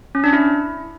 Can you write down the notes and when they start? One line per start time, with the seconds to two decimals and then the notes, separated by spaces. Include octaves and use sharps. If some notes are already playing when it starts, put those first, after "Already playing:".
0.15 C#4
0.24 D4
0.33 E4